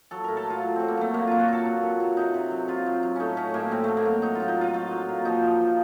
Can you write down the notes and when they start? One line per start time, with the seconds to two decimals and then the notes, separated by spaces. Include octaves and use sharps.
0.11 F#3 A4
0.24 A2 A#4
0.37 A4
0.45 F#3 F4
0.63 F#3
0.76 F#3 C4
0.88 A#3
0.97 F#3 A3
1.14 A#2 A#3
1.27 F#3 F4
1.40 F#4
1.48 F#3 A4
1.65 A#2
1.83 A#2
2.00 F#3
2.17 C3 D#4
2.34 C3
2.51 F#3
2.68 C3 F4
2.86 F#3
3.03 F#3
3.16 A2 C#4 D#4
3.37 F#3 C#4
3.54 A2 A#3
3.71 A2 C4
3.84 F#3 A3
3.97 A#3
4.06 F#3
4.22 F#3 D#4
4.35 F#3 F4
4.48 D#4
4.57 F#3 F4
4.73 F#3 F4
4.91 F#3
5.08 A#2
5.25 F3 D#4
5.43 F3
5.60 F3